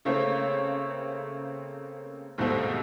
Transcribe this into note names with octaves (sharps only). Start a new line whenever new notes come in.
C#3 A3 A#3 C4 C#5
D#2 G#2 B2 G3 A3 C4